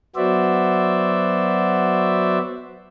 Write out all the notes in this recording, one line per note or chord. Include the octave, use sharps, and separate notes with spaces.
F#3 B3 F#4 C5 D5 E5